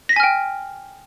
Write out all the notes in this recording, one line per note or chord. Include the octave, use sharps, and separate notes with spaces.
G5 G#5 F6 A#6 B6